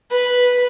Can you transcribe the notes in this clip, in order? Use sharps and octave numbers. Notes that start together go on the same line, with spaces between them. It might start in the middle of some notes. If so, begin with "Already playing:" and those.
B4